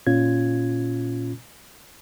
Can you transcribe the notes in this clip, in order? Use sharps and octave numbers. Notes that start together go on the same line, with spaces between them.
A#2 C#4 F4 G#6